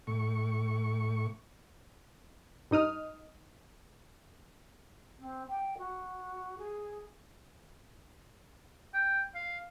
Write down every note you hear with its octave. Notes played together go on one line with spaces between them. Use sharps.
A2 C#6
G2 D#4 D#6 F6
C4
G5
F#4
G#4
G5
F5